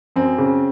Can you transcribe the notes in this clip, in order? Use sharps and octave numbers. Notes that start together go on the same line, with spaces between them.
F#2 C4
C#3